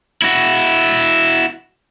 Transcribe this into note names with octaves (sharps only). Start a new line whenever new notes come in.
E4 F#4